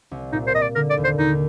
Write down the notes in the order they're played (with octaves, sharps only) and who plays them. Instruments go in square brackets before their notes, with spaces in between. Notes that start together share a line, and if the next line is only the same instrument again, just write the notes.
[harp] C2
[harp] A#2 [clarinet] D#4
[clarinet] C5
[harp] A#2 [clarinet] D#5
[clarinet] D5
[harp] D3 [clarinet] A#4
[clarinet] D5
[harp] D#2
[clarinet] C5
[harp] D#2 [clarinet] D#4